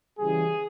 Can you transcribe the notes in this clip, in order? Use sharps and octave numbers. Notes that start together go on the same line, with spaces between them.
C#3 E3 G3 G#4